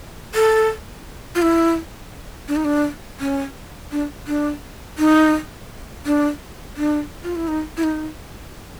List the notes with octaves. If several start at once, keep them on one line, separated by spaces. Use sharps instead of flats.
A4
F4
E4
D4
D#4
D4
C#4
D4
D4
D#4
D4
D4
F4
E4
D#4
E4
D#4